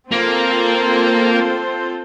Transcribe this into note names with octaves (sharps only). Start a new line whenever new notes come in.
A#3 C4 F4 A4 C5